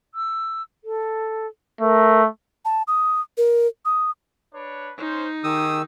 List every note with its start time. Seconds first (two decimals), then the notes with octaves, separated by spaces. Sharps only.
0.15 E6
0.84 A4
1.81 A3 A#4
2.65 A5
2.88 D#6
3.37 A#4
3.85 D#6
4.53 D4 B4 C#5
4.98 C#4 D#4 C5
5.44 D#3 G4 G#4 D#6 E6